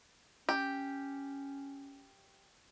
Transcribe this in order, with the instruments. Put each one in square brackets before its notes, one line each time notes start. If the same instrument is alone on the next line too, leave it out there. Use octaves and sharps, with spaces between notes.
[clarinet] C#4 [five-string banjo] G4